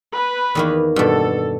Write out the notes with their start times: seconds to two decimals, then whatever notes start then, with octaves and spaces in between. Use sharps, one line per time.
0.14 B4
0.55 E2 D#3 A#3
0.96 G2 B2 A4